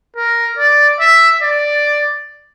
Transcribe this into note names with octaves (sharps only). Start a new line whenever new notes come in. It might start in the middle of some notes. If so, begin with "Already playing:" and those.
A#4
D5
E5
D5